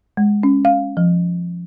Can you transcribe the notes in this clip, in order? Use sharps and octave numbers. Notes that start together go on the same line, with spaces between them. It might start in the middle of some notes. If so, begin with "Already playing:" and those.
G#3
C#4
F5
F3